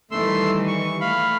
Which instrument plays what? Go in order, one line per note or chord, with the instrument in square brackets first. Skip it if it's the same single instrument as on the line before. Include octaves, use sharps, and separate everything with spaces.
[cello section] D#3 E3 G3 [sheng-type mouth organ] A3 C6 E6
[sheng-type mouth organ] C#6
[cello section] A3 [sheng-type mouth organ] F5 B5